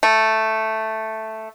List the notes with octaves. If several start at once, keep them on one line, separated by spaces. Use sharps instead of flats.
A3